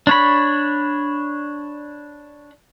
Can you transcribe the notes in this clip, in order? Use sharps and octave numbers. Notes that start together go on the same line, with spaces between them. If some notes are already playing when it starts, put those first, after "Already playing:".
D4 C#5 B5